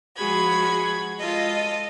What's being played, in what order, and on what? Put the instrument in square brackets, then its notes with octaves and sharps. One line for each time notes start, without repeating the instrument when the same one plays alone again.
[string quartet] F3 G#3 F#4 G#4 B5 G#6
G#3 F4 A4 D#5